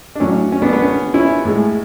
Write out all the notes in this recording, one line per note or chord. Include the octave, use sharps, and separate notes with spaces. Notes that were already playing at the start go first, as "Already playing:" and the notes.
D4
A2 F#3 C#4
C#4
B3 D4
B3
C#4
C#4 E4
A2 G#3